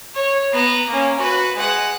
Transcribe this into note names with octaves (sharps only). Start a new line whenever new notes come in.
C#5
B3 A#5
A#3 C#4
F#4 B4
G#3 F#5